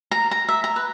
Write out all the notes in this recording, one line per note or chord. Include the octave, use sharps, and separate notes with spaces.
A#5
A#5
E5
A#5
B4